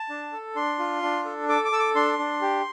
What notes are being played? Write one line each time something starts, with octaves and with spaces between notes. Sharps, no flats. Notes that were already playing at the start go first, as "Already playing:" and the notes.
Already playing: A5
D4
A4
D4 C6
F4
D4
A4
A4 D6
D6
A4 E6
D6
D4 C6
D4
G4